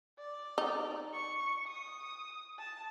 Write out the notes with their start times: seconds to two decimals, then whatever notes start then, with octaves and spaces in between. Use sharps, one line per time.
0.19 D5
0.58 D#4
1.14 C#6
1.67 D#6
2.59 A5